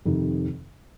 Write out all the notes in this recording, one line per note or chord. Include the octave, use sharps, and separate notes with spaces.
F2 C3 D#3